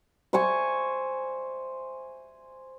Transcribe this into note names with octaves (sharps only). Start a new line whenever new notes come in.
C5 E5 G#5 C#6